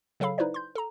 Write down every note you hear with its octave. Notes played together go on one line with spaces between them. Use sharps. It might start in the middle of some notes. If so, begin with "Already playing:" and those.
C#3 F#3 A4 F5 B5
D#4 E4 B4 C5 D5
C6 G6
A4 A#5